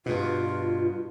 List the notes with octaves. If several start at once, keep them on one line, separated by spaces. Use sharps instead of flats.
G2 B2 F4